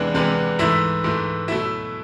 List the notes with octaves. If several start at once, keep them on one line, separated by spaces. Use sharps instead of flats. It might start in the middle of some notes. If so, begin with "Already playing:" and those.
Already playing: E2 C3 E3 G#3 B3 D4 D5
E2 C3 E3 G#3 B3
G#2 E3 A3 E4 E5
G#2 E3 A3
B2 F#3 A3 E4 E5